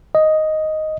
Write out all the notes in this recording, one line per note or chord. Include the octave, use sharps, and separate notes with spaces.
D#5